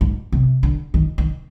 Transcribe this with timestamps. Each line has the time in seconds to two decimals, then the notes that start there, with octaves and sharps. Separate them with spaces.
0.01 G#2
0.32 C3
0.63 D3
0.94 D#3
1.18 D#3